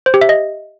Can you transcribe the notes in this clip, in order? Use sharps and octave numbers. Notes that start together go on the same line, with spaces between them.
C5
G4
E5
D#5